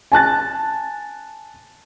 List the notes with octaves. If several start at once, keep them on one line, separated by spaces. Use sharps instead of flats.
G#5 A5 F#6 A6